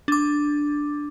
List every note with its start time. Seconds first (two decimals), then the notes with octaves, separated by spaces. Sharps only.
0.08 D4 D6